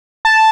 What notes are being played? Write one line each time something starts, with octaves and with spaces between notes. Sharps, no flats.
A5